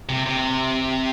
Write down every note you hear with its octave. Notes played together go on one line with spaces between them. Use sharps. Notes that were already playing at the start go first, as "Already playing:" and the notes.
C3
C3